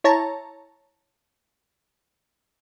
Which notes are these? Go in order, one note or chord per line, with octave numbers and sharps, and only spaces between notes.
E4 C#5 A5 A#5